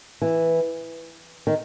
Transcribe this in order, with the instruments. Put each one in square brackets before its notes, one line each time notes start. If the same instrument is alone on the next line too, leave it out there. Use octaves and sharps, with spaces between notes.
[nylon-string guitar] E3
D#3